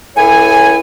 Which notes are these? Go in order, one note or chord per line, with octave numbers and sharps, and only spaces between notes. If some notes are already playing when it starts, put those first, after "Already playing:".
C#2 A2 E4 C#5 G#5